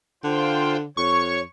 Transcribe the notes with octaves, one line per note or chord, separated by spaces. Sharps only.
D3 F4 C5 G5
F2 C#5 C#6